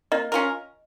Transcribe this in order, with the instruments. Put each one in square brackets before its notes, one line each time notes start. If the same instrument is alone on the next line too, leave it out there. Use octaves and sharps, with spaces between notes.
[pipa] A#3 [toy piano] D#5
[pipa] C#4 F4 A#4